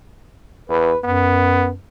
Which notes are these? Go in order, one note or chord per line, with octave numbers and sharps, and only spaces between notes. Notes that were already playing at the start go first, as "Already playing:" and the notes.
E2 B4
F#2 B3